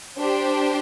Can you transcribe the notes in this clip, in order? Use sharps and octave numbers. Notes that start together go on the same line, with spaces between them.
D4 G4 C5